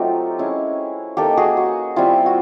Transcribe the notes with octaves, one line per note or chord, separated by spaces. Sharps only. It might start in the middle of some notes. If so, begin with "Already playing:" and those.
Already playing: F#3 A3 C4 D#4 F4 G4
G#3 C#4 E4
A#3 D#4 G4 A4
F#4 G#4
F#4
G3 C4 E4 F4
F#4